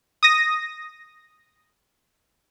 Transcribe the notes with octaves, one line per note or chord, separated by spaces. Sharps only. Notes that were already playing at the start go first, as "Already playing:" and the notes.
D#6 A#6